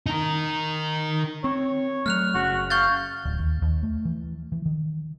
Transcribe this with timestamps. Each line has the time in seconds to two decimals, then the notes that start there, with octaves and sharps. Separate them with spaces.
0.06 D#4 A#4
1.44 C4 C#5
2.06 F#3 A3 F6 F#6 F7
2.34 F#1 C#3 F#4
2.70 F5 C#6 G6 A6
3.25 D1
3.39 D#2
3.62 D#2
3.83 A3
4.05 E3
4.52 E3
4.66 D#3